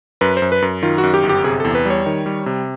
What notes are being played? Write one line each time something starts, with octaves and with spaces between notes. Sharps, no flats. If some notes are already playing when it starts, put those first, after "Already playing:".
F#2 B4
C5
F#2
B4
F#2
D#3 F4
F#4
F#2
G4
G1
G4
C3 G#4
E2 A4
B4
G3 C#5
D#3
G3
C3